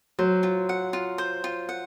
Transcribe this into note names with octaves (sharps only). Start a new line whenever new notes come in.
F#3 C5
F4
F#5
F4
C5
F4
F#5